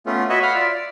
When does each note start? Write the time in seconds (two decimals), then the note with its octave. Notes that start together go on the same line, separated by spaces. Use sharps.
0.06 A3 B3 C#4 F4
0.29 F#4 B4 C#5 D#5 E5
0.43 B4 F5 F#5 B5 F6
0.55 F4 D5 E5
0.70 D5